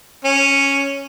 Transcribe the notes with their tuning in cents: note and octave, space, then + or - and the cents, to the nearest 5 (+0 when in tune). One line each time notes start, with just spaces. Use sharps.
C#4 -5